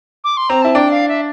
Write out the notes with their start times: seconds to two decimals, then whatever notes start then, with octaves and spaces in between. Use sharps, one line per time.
0.24 D6
0.37 C6
0.49 C4 A#5
0.62 E4 A5
0.75 D4 G5
0.91 F5
1.09 E5